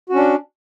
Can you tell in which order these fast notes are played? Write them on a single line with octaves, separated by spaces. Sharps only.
F#4 C#4 D4